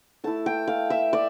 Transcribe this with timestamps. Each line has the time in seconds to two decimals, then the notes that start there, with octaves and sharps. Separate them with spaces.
0.24 A3 E4 A5
0.46 G5
0.68 F5
0.90 E5
1.13 D5